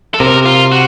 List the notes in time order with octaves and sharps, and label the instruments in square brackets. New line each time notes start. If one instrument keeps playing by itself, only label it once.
[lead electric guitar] A4
[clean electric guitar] C3 [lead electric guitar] A#4
[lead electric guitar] F4
F#4